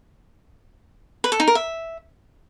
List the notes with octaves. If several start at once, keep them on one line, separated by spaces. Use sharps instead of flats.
B4
A4
D#4
A#4
E5